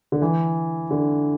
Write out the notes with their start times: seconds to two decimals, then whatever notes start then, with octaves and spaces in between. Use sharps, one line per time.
0.12 D3
0.22 E3
0.91 D3